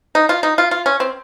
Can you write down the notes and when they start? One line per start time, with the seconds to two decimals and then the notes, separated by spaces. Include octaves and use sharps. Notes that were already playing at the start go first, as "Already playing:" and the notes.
0.15 D#4
0.29 F4
0.43 D#4
0.58 F4
0.71 F4
0.86 C#4
1.00 C4